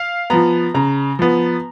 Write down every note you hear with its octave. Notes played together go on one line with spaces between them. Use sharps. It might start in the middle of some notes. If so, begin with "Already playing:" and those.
Already playing: F5
F3 B3 A#5
C#3 A#5
F3 B3